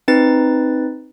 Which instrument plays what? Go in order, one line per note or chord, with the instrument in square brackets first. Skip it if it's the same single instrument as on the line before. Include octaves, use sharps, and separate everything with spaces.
[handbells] C4 D#4 B4 A6